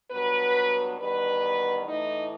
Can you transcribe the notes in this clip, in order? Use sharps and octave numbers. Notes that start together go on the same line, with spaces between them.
G2 F#3 B3 B4
E2 D#3 G3 B3 B4
A2 E3 A3 D#4